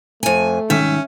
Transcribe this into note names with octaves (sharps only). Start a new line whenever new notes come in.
F2 A3 G#5
C2 G#2 D#3 C#4 E5